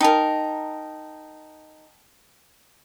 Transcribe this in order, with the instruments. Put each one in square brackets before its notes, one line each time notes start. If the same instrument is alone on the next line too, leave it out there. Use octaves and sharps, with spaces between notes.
[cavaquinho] D#4 A#4 [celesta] G5 A5